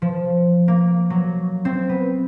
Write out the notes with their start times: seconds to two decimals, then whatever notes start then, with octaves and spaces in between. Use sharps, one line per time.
0.02 F3
0.68 A#3
1.10 F#3
1.65 C4
1.89 B3